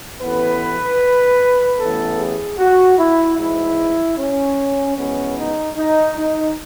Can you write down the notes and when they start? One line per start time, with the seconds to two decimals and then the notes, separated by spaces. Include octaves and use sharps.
0.21 A1 A2 E3 B3 B4
1.80 A1 A2 E3 B3 A4
2.19 G#4
2.59 F#4
2.98 E4
3.38 G#2 E3 G#3 E4
4.17 C#4
4.97 F#2 E3 G#3 B3 C#4
5.37 D#4
5.77 D#4
6.16 D#4